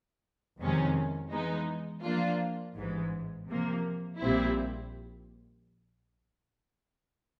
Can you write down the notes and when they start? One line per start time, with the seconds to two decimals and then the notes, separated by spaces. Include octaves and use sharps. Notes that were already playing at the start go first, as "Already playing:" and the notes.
0.60 F2 C3 D#3 G#3 C#4
1.31 E3 G#3 B3 D#4
2.03 F3 A#3 D4 F4
2.76 A1 G#2 E3 G#3
3.47 C3 F3 A#3
4.19 A#1 A#2 G3 C4 E4